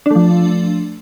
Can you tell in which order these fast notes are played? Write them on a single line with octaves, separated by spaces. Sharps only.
D4 A3 F3